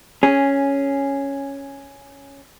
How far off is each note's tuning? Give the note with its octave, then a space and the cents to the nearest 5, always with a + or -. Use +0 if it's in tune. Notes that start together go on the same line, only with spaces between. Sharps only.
C#4 +0 G#4 -5